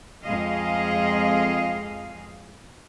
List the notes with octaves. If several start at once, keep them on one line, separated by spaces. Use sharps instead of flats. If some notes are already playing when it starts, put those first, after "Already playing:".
F2 G#3 G#4 D#5 F5